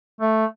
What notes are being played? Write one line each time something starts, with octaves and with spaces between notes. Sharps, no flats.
A3